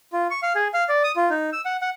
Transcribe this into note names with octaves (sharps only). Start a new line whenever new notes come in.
F4
C#6
F5
G#4
F5
D5
D#6
F4
D#4
E6
F#5
F#5